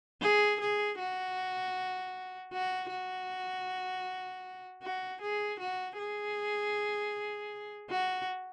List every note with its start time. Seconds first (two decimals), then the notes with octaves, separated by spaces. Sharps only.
0.22 G#4
0.61 G#4
0.99 F#4
2.53 F#4
2.92 F#4
4.83 F#4
5.22 G#4
5.60 F#4
5.99 G#4
7.91 F#4